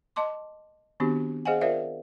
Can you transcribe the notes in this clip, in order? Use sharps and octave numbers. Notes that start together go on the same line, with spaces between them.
D#5 A5 C6 D6
D#3 B3 C4 D4 F#4 G4
G#4 C5 D#5 F5 F#5 G#5
F4 A#4 C5 D5 E5 F5